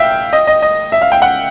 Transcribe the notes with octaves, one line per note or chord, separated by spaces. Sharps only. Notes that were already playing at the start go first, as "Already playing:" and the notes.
Already playing: E5 F5 G5
D#5
D#5
D#5
E5
F5
G5
F#5